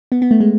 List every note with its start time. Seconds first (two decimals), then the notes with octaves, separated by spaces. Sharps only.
0.12 B3
0.22 B3
0.31 A3
0.40 G#3